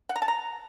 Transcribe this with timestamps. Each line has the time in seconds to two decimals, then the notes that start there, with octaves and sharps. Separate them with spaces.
0.09 F#5
0.16 A#5
0.22 A5
0.28 A#5